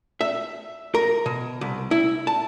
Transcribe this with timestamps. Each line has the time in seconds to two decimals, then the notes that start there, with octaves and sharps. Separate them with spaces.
0.21 E5
0.94 A#4
1.26 B2
1.61 C2
1.91 E4
2.27 A5